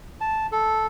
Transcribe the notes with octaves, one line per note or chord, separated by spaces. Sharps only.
A5
A4